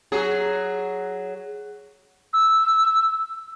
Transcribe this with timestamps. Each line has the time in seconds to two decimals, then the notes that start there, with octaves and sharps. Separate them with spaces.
0.12 F#3 G#4
2.33 E6